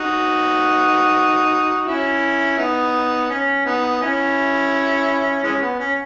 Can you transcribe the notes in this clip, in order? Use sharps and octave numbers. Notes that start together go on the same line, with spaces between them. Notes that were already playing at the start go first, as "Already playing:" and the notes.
Already playing: D#4 F#4
C#4 E4
B3 D#4
C#4
B3 D#4
C#4 E4
E3 G#3 C#4
B3
C#4